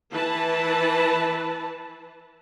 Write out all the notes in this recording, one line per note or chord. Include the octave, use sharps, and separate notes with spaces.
E3 B4 A5